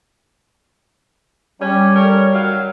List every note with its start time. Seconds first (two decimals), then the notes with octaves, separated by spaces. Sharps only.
1.61 G3 C#4 G4
1.96 A3 A#4 C#5
2.33 D#3 F#3 F5